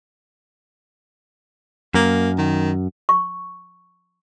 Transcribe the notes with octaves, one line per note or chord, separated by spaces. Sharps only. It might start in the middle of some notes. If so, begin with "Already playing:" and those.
F#2 A#3
D#3
C#6